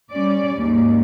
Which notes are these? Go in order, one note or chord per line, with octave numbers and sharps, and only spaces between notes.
G3 C#4 D5
D#2 G#2